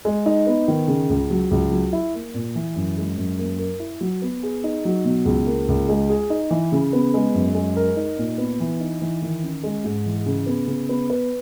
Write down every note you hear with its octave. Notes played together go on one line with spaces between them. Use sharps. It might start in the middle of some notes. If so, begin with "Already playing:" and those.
G#3
D#4
B3
D#3
C#3
C#2
F#3
C#2
F#3
E4
A#3
A#2
E3
F#2
G#3
F#2
A#3
A#4
E4
F#3
B3
G#4
D#4
F#3
B2
C#2
A#3
C#2
G#3
G#4
D#4
E3
C#3
B3
G#3
F#2
G#3
A#4
D#4
A#2
B3
E3
D#4
E3
D#3
C#4
G#3
G#2
E3
C#3
B3
C#3
B3
B4